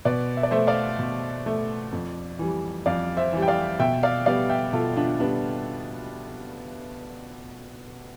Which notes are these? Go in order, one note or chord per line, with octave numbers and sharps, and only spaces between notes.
B2 B4 D5
E5
D5
A3 C5 E5
D5 F5
B2
A3
F2
E3 G3
F2 D5 F5
C5 E5
E3 G3
G5
D5 F5
B2 E5 G5
D5 F5
G3 B3 D5 F5
E5 G5
B2 F4 A4
D4 F4
G3 B3 D4